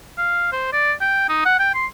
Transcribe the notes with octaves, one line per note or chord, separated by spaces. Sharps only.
F5
C5
D5
G5
D#4
F#5
G5
C6